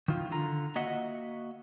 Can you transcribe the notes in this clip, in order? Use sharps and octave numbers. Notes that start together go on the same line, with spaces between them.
D#3 F3 E4 F4
D3 F4 A#5
A#3 F#4 D#5 E5 F#5